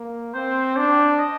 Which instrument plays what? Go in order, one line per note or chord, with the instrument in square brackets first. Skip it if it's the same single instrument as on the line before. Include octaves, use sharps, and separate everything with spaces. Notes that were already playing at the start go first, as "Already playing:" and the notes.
Already playing: [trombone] A#3
[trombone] C4 [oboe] C5
[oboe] C5
[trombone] D4 [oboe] D5
[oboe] D#5